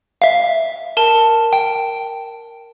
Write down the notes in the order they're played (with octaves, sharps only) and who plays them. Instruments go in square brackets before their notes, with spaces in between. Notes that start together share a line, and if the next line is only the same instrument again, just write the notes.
[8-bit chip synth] E5 F5
[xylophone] A#4 A5
[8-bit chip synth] G5